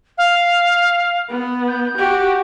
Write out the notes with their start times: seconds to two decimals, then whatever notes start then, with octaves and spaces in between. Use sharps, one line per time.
0.18 F5
1.30 B3
1.68 G6
1.98 F#4 G4